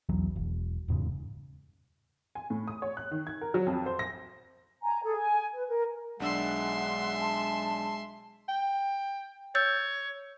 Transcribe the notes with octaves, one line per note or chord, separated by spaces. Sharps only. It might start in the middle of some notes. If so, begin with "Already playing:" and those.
B1 E2 E3 F#3
E1
D#1 E2 G#2 C#3
G#5
A2
D#6
C#5
F#6
D#3
G#6
A#4
F#3
F2
C5
A#6
G#5 A#5
G#4 A4
G#5
B4
A#4
B1 G#3 D4 E5 F#5 C6 E6
A5
G5
C#5 E6 G6 A6